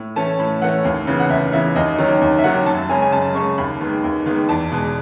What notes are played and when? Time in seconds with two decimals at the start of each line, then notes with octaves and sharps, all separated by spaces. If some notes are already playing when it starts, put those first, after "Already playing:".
Already playing: A2
0.16 E3 A3 C#4 A5
0.39 A2 B5
0.62 E3 A3 C#4 F#5
0.84 D#2
1.07 C#3 E3 B3
1.20 F#5
1.29 D#2 E5
1.52 C#3 E3 B3 E5
1.76 D#2 D#5
1.98 D#3 F#3 C#4
2.21 D#2
2.38 E5
2.44 D#3 F#3 C#4 F#5
2.66 F#2 A5
2.89 C#3 G#3 C#4 G#5
3.02 G#5
3.12 F#2 A5
3.35 C#3 G#3 C#4 C#6
3.58 D#2 B5
3.81 D#3 G#3 B3
4.04 D#2
4.26 D#3 G#3 B3
4.49 E2 A5
4.72 B2 G#3